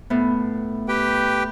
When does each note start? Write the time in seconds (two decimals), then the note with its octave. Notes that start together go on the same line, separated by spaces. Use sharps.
0.10 A2 B3
0.88 G4 B4 G5